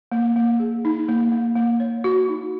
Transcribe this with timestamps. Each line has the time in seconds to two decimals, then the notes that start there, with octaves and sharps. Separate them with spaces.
0.12 A#3
0.36 A#3
0.60 G#4
0.85 D#4
1.09 A#3
1.32 A#3
1.56 A#3
1.80 C#5
2.04 F#4
2.29 D#4